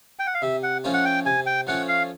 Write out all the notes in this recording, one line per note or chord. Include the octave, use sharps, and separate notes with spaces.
G5
F#5
F5
C3 E5
F#5
F3 A3 C#4 F4
F#5
G5
C3 G#5
G5
F3 A3 C#4 F4 F#5
F5